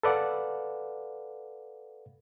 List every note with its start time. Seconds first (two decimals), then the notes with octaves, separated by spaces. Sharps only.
0.03 A4 B4 D5 F5 F#5